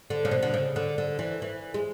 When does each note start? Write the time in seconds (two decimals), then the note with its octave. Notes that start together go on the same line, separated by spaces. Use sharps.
0.10 D3
0.25 C#3
0.31 B2
0.43 D3
0.54 C#3
0.76 D3
0.98 D3
1.19 E3
1.42 E3
1.74 G#3